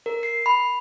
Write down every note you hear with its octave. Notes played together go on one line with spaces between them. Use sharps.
A#4
C7
B5